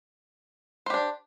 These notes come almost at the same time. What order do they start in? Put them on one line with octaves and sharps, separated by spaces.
C5 G4 D4